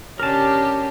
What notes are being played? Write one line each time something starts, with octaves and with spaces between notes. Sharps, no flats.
C#3 C#4 D4 G4 A#4 A5